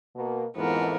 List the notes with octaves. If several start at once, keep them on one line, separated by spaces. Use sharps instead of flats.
B2 A#3
F2 G#2 E3 B3 A#4